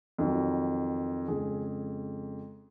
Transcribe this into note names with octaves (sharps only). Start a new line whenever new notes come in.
F2 D#3 F#3
F2 C#3 G#3 G#4